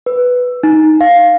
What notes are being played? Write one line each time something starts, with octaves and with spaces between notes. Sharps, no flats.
B4
D#4
F5